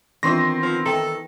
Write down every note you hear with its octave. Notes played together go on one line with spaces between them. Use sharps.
D#3 E3 B3 C4 D4 F4 C6 A#6
F3
D#3 A4 B4 G5 A#5